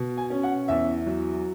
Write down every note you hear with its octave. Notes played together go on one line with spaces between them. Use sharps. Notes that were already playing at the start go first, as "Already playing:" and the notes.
Already playing: B2
G#5
C#4
F#5
E2 E5
F#3